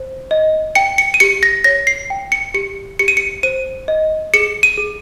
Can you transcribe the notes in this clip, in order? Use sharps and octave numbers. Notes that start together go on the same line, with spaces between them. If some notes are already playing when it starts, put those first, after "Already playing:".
Already playing: C5
D#5
G5 C#7
C#7
D#7
G4 C#7
A#6
C#5 A#6
C7
G5
C#7
G4 C#7
G4 C#7
D#7
C#7
C5 D#7
D#5
G#4 C#7
D#7
G#4